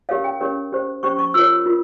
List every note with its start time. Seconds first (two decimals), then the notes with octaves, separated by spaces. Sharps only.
0.09 C#4 G4 A#4 C#5 F5
0.24 G5
0.40 C#4 G4 A#4 C#5
0.72 C#4 G4 C5
1.03 C#4 G4 C5 C#6
1.19 C#6
1.34 F4 A#4 C#5 E6
1.66 F4 A#4